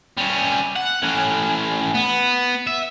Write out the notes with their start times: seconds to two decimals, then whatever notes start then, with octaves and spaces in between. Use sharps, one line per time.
0.17 G3 C#4
0.76 F#5
1.03 A2 C#4
1.95 B3
2.67 E5